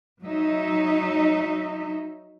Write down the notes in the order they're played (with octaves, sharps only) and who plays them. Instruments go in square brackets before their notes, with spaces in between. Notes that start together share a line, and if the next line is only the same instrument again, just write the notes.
[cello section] F#3 D#4 E5